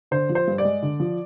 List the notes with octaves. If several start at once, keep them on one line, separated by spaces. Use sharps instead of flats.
D3 C5
F3
C5
G2
D5
G#3
D3
F3